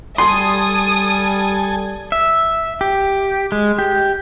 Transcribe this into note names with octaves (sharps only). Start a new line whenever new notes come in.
G3 A4 G#5 C6 D#6
E5
G4
G#3
G4